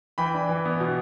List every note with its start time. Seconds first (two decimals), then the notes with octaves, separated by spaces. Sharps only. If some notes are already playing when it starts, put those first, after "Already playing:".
0.18 E3 G5 B5
0.34 D4
0.49 E3
0.65 B3
0.80 B2